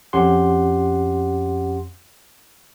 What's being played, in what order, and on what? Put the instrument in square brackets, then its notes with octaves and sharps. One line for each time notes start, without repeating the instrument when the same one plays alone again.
[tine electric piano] F2 C#4 G4 F#5 C6